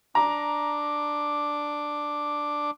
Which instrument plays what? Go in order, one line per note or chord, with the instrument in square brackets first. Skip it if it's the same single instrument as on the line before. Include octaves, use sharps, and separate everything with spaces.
[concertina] D4 D6 [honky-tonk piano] A#5